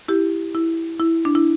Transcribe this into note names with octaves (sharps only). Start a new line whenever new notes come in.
E4 G4
E4
E4
D4
E4